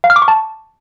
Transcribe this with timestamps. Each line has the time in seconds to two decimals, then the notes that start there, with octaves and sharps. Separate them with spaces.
0.04 F5
0.10 F6
0.16 D6
0.22 C#6
0.28 A5